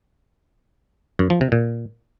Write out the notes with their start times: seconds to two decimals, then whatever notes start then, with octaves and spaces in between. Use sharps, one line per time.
1.19 F#2
1.30 F3
1.41 C3
1.52 A#2